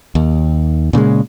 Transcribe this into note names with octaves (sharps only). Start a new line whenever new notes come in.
D#2
A#2 C#3 E3 G#3